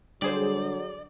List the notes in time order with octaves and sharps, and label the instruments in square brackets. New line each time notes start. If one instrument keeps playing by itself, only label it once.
[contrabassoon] D3 [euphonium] F#3 [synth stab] G3 G#4 C5 [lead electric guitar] D5